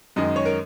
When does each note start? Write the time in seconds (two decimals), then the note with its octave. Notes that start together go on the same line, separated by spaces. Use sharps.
0.16 F#2 D#3 G#3 D#5
0.36 C#5
0.45 A#4